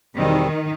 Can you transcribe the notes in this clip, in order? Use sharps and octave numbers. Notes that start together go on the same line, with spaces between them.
E2 B2 D#3 G3 C4